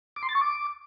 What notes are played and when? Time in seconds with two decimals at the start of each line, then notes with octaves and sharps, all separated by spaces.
0.16 D6
0.23 C6
0.29 A6
0.35 C#6
0.41 D6